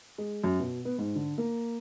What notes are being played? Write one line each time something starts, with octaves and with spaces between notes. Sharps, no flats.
G#3
F#2
B2
B3
G#2
D3
A#3